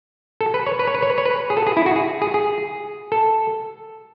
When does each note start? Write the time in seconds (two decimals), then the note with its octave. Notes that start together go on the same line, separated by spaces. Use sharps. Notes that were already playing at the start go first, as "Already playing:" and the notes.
0.41 A4
0.54 B4
0.67 C#5
0.79 B4
0.87 C#5
0.95 B4
1.02 C#5
1.10 B4
1.18 C#5
1.25 B4
1.50 G#4
1.57 A4
1.67 G#4
1.77 E4
1.86 F#4
1.96 G#4
2.22 G#4
2.34 G#4
3.12 A4